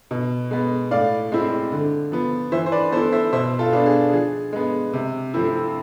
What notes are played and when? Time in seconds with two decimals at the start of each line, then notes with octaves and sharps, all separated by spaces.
0.11 B2
0.51 G#3 B3
0.91 A2 D5 F5
1.32 G#3 C4 E4
1.72 D3
2.12 F3 B3
2.52 E3 C5 E5
2.66 C5
2.72 B4 D5
2.92 B3 A4 C5
2.97 E4
3.12 C5 E5
3.32 B2 C5 E5
3.59 F4 A4
3.73 B3 D4
3.86 G#4
4.13 F3 G#4
4.53 G#3 B3
4.93 C3
5.34 F3 A3 C4 E4